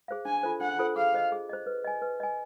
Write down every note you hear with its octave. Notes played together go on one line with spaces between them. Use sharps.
G#4 C5 F5
D4 G#5
F4 A4 C5
D4 F#5
F4 A4 C5
G#4 F5
C5 D#5
G#4
C5 D#5
B4
D#5 G#5
B4
D#5 G#5